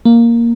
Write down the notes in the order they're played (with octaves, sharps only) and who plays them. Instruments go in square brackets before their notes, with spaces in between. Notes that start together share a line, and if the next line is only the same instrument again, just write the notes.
[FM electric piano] A#3